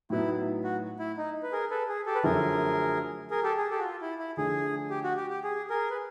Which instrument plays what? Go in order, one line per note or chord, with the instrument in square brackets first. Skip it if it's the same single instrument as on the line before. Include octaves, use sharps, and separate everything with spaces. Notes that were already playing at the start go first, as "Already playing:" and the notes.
[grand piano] A2 F#3 B3 D#4 [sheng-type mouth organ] E4
[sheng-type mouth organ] F#4
E4
D#4
B4
G#4 A#4
A4 B4
G#4
G4 A4
B4
[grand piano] F#2 D3 F3 A3 C#4 [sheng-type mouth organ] G#4 A#4
[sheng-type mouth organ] G#4 A#4
G4 A4
G#4
G4 A4
F#4
F4
E4
E4
[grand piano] D3 F3 A3 D4 [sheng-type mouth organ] G#4
[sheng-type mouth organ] G4
F#4
G4
G4
G#4
G#4 A#4
B4